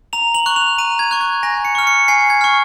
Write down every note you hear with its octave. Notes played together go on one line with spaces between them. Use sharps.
A#5 F7
F#7
C#6 F#6
F7
A#5 D#7
G#6
C#6 F#6
G#6
G#5 A#6
C#7
C#6 F6
C#7
G#5 C7
G#6
C#6 F6